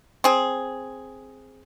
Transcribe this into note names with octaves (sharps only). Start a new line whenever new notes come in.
C4 G#4